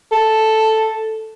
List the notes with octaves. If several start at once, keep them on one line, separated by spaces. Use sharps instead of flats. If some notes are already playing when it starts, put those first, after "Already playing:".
A4